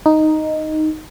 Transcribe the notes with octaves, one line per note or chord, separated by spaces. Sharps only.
D#4